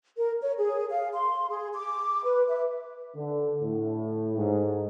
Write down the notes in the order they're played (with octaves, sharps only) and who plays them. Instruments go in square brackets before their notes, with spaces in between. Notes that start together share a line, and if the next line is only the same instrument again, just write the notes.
[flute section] A#4
C#5
G#4
F5
C6
G#4
D6
B4
E5
[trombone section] D3
A2
G#2